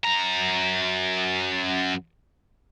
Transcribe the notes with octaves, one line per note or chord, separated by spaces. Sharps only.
F#2 A#5